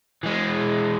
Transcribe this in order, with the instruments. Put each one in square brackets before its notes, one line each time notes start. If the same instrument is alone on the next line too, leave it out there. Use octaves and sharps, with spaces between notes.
[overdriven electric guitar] E3 G#3